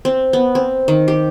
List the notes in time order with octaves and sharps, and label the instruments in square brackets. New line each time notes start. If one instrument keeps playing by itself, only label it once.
[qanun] C4
B3
C4
D#3
G4